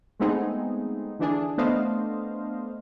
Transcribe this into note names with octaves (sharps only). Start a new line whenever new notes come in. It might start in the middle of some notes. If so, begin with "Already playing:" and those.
G#3 A3 B3 C4 D#4 G#4
D3 E3 D4 G#4
A3 B3 D4 C5 D#5 F5